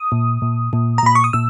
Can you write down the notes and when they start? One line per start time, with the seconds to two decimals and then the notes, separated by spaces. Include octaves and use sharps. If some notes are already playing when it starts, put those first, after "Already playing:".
Already playing: D#6
0.12 A#2
0.42 A#2
0.73 A#2
0.98 A#5
1.03 A#2 B5
1.15 C#6
1.24 D#6
1.33 A#2 E6